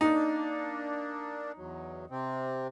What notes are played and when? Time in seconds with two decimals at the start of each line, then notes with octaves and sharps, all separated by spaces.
0.01 A#3 D4 D#4
1.57 E2 F#3
2.10 C3 C4